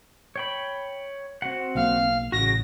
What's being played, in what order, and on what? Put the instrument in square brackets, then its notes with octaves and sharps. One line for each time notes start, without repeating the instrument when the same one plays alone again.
[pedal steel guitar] C#5 G5 B5
C4 F#4 F#5
[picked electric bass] B1 F#3 A#3 [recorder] F5
[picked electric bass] A1 [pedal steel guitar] C#3 F#4 [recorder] A#6